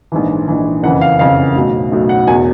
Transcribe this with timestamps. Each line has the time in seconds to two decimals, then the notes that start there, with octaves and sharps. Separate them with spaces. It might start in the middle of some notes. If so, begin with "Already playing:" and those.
0.12 A#1 G#2 E3
0.48 A#1 G#2 E3
0.83 F#1 F2 C#3 E3 F#5
1.01 F5
1.19 F#1 F2 C#3 E3 F5
1.56 B1 A2 F#3
1.92 B1 A2 F#3
2.09 F#5
2.27 E1 E2 B2 G#5